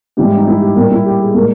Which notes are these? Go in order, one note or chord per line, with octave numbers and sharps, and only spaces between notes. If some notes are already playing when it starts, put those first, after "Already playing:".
G#2 E3 G3 G4
G4
D#4
E4
G4
A#2 G3 A#4
E4
G4
G#4
A#2 G#3 A#4